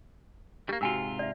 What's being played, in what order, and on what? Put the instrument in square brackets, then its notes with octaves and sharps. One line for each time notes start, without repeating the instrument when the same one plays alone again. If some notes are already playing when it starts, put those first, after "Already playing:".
[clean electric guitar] G3 A#3 [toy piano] G4
[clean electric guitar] G#2 C3 F4 [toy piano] F#4 G#5 E6
[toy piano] D5 E5